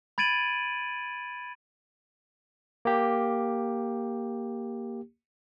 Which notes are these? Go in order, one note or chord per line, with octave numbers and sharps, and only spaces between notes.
B5 G#6 A6 D7 D#7 F#7
A#3 G4